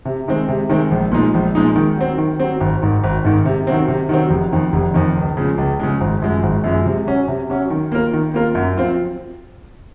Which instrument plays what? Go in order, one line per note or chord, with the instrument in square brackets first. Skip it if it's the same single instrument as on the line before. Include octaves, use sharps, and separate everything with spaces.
[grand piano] C3
D#3 G#3 C4
C3
D#3 G#3 C4
A#1
A#2 F3 G#3 D#4
A#1
A#2 F3 G#3 D#4
D#3
F#3 C4
D#3
F#3 C4
G#1
G#2 D#3
G#1
G#2 D#3
C3
D#3 F#3 C4
C3
D#3 F#3 C4
F1
F2 D#3
F1
F2 D#3
C#2
C#3 F3 G#3
C#2
C#3 F3 G#3
G#1
F#2 F3 G#3
G#1
F#2 F3 G#3
C3
F#3 C#4
C3
F#3 C#4
D#3
A#3 F4 A#4
D#3
A#3 F4 A#4
F#2
F3 C4 F4